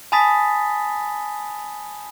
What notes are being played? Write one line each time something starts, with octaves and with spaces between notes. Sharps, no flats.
G#5 A5 B5 D#6 A6 B6